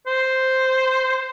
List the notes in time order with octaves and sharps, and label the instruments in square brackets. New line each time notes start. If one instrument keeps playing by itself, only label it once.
[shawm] C5